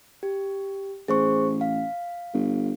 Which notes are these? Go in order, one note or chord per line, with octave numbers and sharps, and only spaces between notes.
G4
A1 G#4 C5 C#6
F5
G1